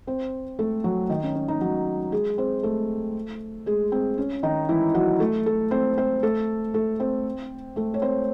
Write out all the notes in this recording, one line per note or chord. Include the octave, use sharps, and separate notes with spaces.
C4 C5
A3 A4
F#3 F#4
D#3 D#4
C#4
C#4
D#3 D#4
F#3 F#4
G#3 G#4
C4 C5
A3 A4
G#3 G#4
C4
C#4
D#3 D#4
E3 E4
F#3 F#4
A3 A4
A3 A4
C4 C5
C4 C5
A3 A4
A3 A4
C4 C5
A3 A4
C#5
C4 C5